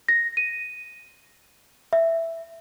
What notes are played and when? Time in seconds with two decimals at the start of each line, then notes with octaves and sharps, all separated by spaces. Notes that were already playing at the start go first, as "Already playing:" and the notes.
0.08 A#6
0.37 D#7
1.93 E5